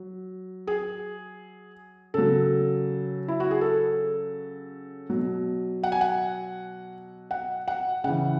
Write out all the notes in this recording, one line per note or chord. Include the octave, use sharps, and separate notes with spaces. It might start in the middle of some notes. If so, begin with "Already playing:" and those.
Already playing: F#3
G#4
C#3 F#3 A4
E4
F#4
G#4
A4
B2 F#3
F#5
G#5
F#5
F#5
F#5
C#3 E3 F#5